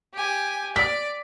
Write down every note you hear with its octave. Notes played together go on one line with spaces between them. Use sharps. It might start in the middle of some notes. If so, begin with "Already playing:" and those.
G4 G#5
D5 B6